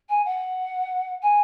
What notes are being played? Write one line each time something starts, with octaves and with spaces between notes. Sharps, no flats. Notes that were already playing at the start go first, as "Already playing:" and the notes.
G#5
F#5
G#5